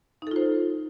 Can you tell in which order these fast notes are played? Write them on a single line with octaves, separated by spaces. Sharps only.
D#4 A4 F4 C5